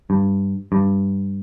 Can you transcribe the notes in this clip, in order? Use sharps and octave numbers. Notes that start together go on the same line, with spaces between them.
G2
G2